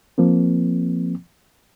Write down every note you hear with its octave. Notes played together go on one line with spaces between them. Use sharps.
F3 A#3 C4